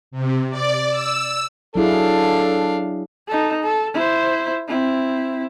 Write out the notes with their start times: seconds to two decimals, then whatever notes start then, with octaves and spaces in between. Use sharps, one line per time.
0.11 C3
0.50 D5
0.90 E6
1.75 F#3 D4 E4 G#4 A4 F5
3.28 D#4 A4
3.63 A4
3.94 E4 C5
4.68 C4 E4